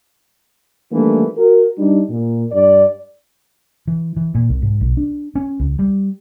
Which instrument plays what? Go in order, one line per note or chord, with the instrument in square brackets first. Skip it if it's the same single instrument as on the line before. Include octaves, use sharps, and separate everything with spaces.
[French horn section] D#3 E3 G3 A3 A#3 D4
F#4 A#4
G3 D4 D#4
A#2
G2 D5
[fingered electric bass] E3
E3
A#2
C2
G#2
B1
D4
C#4
C#2
G3